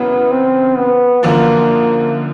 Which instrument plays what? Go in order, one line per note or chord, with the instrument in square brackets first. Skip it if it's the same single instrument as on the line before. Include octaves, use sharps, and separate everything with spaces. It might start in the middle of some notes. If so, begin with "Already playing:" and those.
Already playing: [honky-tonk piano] F#2 C#3 E3 [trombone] B3
[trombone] C4
B3
[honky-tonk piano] F#2 D3 F3 [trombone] A#3